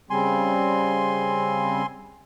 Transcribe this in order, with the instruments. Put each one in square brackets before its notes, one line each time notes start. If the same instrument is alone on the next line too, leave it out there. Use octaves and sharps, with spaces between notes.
[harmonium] C#3 G3 C4 [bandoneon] G#5 C6